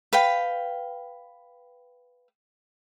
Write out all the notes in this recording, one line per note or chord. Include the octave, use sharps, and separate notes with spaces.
B4 F5 G5